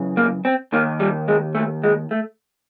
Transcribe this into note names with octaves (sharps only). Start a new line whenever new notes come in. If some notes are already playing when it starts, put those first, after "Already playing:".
Already playing: F#2 C#3 E3
A#3
C4
D#2 D#3 A#3
G3
G#3
A3
G#3
A3